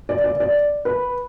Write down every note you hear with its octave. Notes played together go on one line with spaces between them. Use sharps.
D5
D5
D5
B4